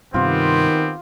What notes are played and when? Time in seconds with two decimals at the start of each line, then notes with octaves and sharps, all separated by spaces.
0.14 G2 C3 D#3 B3 C4 F4 G4